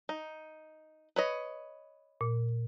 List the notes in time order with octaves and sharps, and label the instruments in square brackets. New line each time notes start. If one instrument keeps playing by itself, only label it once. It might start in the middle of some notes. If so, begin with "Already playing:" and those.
[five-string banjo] D#4
B4 C#5 D#5
[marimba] A#2